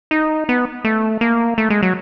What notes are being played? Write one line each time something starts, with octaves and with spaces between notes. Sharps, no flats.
D#4
B3
A3
A#3
A3
G#3
F#3